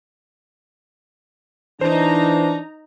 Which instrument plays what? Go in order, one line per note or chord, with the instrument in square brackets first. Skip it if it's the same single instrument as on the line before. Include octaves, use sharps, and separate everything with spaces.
[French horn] E3 [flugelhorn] D4 [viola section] D#4 A#5 [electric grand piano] C5